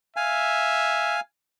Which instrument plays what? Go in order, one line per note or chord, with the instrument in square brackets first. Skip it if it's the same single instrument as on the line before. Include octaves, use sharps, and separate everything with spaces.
[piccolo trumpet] E5 [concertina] F5 G#5